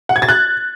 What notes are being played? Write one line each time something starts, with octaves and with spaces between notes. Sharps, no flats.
F#5
G#6
A6
F#6